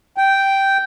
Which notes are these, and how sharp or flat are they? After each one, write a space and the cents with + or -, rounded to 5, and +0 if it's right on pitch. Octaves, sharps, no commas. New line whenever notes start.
G5 -5